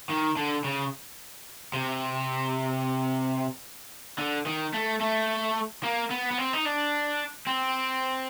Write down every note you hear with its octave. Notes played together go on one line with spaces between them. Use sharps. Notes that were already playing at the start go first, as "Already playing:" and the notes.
D#3
D3
C#3
C3
D3
D#3
A3
A3
A#3
B3
B3
C4
D#4
D4
C4